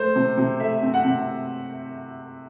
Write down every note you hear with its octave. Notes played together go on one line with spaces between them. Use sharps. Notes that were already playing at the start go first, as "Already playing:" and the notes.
Already playing: A3 C5
C3
C3
A3 E5
C4
F#5
C3